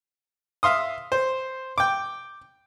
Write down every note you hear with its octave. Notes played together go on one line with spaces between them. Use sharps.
E5 F5 C6 D#6
C5
G5 D6